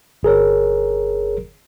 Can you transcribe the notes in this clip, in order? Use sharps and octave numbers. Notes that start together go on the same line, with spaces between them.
G1 G#4 A#4 C#5